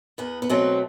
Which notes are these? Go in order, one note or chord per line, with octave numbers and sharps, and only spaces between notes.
E2 B3
B3
B2 F#3 A3 C4